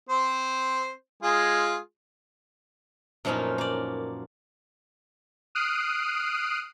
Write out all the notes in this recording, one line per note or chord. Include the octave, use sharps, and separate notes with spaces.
C4 C5
G#3 F4 G#4
F#2 A#2 F3 B3 C#4 D#4
A#3 D5
D#6 F6 F#6 C7 D7 D#7